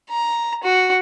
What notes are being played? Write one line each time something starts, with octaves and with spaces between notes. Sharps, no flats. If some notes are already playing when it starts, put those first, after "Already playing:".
A#5
F#4